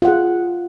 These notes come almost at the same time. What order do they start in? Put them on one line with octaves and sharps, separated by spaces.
F4 F#5 G#4